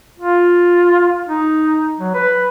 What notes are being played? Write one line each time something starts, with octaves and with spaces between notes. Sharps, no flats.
F4
D#4
F#3
B4